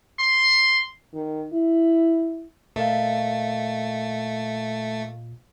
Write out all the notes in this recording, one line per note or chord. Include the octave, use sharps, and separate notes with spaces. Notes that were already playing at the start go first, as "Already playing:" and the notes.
C6
D#3
E4
A#2 A3 A#4 D#5 F5